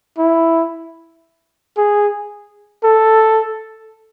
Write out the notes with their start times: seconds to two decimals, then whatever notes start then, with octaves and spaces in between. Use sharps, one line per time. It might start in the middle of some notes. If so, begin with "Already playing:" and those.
0.18 E4
1.77 G#4
2.84 A4